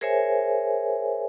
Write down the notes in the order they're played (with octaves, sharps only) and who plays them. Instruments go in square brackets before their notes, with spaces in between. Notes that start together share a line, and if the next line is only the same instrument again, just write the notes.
[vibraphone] G#4 A#4 C5 C#5 E5 G#5